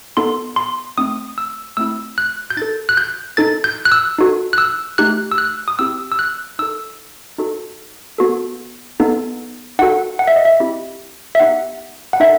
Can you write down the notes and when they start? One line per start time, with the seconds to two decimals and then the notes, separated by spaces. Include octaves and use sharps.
0.17 B3 D#4 A4 C6
0.56 C6
0.98 A3 C4 D#4 D#6
1.38 E6
1.77 A3 C4 E4 E6
2.18 F#6
2.50 G6
2.57 D#4 A4 A6
2.89 F#6
2.97 G6
3.37 D#4 A4 A6
3.64 G6
3.85 F#6
3.92 E6
4.18 D#4 F#4 A4
4.53 F#6
4.58 E6
4.98 A3 D#4 G4 F#6
5.32 E6
5.38 F#6
5.68 D#6
5.79 C4 E4 G4 E6
6.12 E6
6.19 F#6
6.59 D#4 A4 E6
7.38 D#4 F#4 A4
8.18 B3 F#4 A4
9.00 B3 D#4 A4
9.79 D#4 F#4 A4 F#5
10.19 F#5
10.27 E5
10.36 D#5
10.45 E5
10.60 C4 E4 G4
11.35 E5
11.40 B3 D#4 G4 F#5
12.13 F#5
12.20 D#4 A4 E5